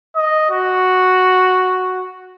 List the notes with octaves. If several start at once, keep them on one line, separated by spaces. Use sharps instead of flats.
D#5
F#4